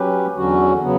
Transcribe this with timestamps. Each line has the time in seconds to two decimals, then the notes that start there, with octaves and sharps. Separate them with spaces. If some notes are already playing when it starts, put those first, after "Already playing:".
Already playing: F#3 C#4 G4 B4
0.36 E2 D3 F#3 C#4 F#4
0.82 C#3 F#3 B3